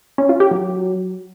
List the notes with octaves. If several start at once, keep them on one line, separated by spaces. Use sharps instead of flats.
C#4
F4
G4
F#3